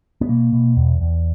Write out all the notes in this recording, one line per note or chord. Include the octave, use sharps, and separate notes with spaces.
B3
B2 A#3
B2
E2
E2